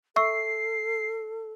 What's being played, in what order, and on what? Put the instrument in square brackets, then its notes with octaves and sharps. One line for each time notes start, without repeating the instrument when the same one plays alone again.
[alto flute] A4 [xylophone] E5 C#6 E6 [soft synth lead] C7